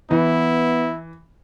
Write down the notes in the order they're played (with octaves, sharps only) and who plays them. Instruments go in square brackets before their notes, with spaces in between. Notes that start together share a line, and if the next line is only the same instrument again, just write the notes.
[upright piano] E3 [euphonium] B3 [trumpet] E4